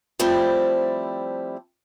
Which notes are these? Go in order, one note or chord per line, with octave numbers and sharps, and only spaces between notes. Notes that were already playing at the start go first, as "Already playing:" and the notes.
F3 G3 A3 C4 E4